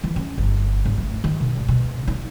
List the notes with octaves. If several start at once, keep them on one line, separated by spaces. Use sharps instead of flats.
E3
C#4
G1
G#2
A3
D#3
B2
G#1
B2
D#4